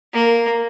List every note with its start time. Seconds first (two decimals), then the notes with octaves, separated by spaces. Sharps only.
0.13 A#3